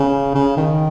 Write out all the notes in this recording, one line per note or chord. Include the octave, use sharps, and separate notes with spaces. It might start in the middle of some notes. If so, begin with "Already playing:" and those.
Already playing: C#3
C#3
D#3